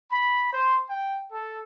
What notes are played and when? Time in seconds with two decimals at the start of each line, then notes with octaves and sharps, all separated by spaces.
0.11 B5
0.52 C5
0.88 G5
1.31 A4